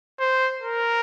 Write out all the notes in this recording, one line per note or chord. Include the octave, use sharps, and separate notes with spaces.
C5
A#4